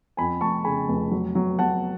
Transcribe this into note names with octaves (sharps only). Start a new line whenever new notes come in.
F2 G#5 B5
F1 A5 C#6
C#3 G#5 B5
F1
F#3
F#3
F#3 F#5 A5